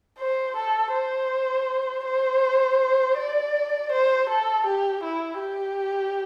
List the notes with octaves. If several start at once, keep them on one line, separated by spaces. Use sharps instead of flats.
C5
A4
C5
C5
D5
C5
A4
G4
E4
G4